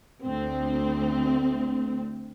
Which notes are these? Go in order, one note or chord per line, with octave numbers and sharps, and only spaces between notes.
D2 C4